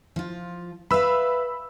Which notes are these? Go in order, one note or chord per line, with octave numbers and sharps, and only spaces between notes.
F3 F4
B4 E5 F5 B5 E6